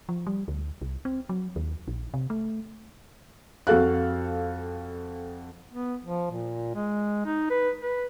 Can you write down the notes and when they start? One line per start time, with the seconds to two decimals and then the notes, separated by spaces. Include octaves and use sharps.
0.09 F3
0.27 G3
0.48 D2
0.82 C2
1.05 C4
1.29 F#3
1.56 D#2
1.88 A#1
2.14 C3
2.30 A3
3.67 F2 F#4 A4 F5 F#6
5.72 B3
6.05 F3
6.32 A#2
6.75 G#3
7.26 D#4
7.50 B4
7.81 B4